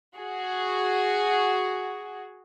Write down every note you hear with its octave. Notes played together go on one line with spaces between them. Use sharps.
F#4 G#4